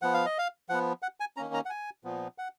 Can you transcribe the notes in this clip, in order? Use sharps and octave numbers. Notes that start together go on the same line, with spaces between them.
F3 B3 F#5
F5
D#5
F5
F3 B3 F#5
F#5
G#5
D#3 A#3 C#4 A#5
A#5
F#5
G#5
A#2 F3 B3
F#5